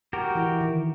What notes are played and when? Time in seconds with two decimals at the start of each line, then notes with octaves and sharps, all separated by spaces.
0.13 F#4 G4 A#4
0.35 E3 E4
0.61 D#3